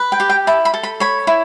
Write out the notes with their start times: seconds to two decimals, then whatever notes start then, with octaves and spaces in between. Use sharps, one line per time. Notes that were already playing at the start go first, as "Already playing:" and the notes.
Already playing: B4
0.12 G5
0.20 G4
0.29 G5
0.47 E4 A5
0.65 B5
0.74 A4
0.83 B5
1.00 C#5 B5
1.27 E4